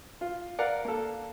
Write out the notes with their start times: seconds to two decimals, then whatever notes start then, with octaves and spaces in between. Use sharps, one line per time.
0.21 F4
0.59 A#4 D5 F5 F#5
0.85 A#3 A4